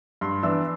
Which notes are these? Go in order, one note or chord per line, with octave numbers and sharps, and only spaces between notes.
G2 C6
E3 B3 D4 E6